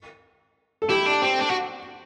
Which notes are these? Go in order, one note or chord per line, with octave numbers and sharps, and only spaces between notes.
A4
E4 G4
D4
C4
D4
F#4